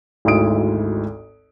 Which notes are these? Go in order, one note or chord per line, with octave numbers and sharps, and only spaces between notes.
G#1 D2 G#2 E4 D#6 D7